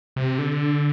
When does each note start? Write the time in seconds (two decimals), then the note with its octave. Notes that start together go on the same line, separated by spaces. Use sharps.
0.16 C3
0.39 D3